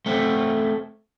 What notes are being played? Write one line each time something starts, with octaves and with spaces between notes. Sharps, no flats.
A3 C4